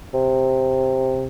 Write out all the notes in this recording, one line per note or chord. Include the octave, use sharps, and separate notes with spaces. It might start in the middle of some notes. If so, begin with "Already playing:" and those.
C3